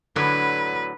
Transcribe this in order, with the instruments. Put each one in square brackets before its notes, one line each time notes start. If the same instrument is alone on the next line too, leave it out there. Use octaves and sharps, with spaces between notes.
[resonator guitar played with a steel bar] A2 D3 F#3 [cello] B4